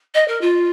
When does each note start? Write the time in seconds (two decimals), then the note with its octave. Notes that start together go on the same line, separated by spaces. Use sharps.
0.15 D#5
0.28 A#4
0.41 F4